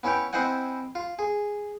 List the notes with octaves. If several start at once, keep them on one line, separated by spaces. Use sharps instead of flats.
B3 C#4 E4 C#5 G5
C4 E4 C5 D#5 F#5 G#5
F4
G#4